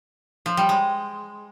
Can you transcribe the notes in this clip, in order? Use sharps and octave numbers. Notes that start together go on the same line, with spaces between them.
F3
G3
G#3